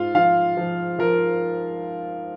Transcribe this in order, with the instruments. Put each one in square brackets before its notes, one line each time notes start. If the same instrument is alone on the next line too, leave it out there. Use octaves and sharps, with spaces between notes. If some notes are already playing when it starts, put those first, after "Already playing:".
Already playing: [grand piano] G#2 F4 F5
F3 F4 F5
F3
F3 A#4